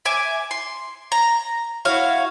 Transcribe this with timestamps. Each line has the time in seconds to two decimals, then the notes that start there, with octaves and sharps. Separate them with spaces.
0.05 E5 G#5 D6
0.51 C6
1.12 A#5
1.85 E4 F#4 C#5 F5